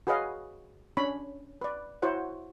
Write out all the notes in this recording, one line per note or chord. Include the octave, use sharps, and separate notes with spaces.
F#4 G#4 B4 C#5 D#5 F5
C#4 D4 C#5 B5
B4 D5
E4 F#4 C5 C#5 F#5